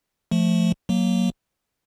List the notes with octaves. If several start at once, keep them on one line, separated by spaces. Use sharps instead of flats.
F3 A3
F#3 A#3